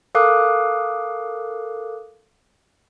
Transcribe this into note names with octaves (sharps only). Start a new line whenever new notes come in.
A4 A#4 F5 D6 D#6 F#6